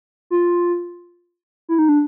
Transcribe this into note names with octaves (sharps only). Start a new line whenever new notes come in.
F4
E4
D#4
D4